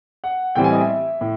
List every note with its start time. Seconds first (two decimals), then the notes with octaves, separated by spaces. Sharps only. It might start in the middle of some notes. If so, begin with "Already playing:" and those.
0.24 F#5
0.55 A2 E3 G3 C4 G5
0.64 G#5
0.72 D#5
0.81 E5
1.21 A2